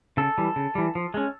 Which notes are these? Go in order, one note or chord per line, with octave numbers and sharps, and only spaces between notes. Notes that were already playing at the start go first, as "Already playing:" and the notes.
C#3 A4
E3 G3
C#3
E3 G3
F3
G#3 C#4